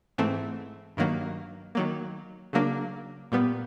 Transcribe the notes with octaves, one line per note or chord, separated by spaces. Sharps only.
G#2 E3 A3 C4
G2 D#3 F#3 A#3
D#3 F#3 A#3
C#3 F#3 A#3 D4
A#2 G3 B3